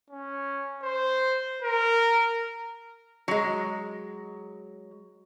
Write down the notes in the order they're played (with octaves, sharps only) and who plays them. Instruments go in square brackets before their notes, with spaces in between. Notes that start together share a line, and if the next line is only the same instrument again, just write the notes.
[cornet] C#4
C5
A#4
[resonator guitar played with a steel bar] F#3 G#3